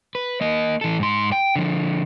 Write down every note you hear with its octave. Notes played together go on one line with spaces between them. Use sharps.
B4
A#3 D#5
E3 A4
G#2 C6
G5
D3 F3